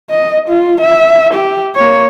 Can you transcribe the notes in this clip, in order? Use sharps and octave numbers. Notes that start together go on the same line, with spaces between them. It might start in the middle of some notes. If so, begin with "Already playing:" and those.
D#5
F4
E5
G4
A#3 C#5